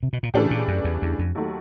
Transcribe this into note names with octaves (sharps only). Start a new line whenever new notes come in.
C3
B2
A#2
A2 C#3 E3 A3 D4 G4
A#2
F#2
E2
E2
F2
D#2 D#3 F#3 A3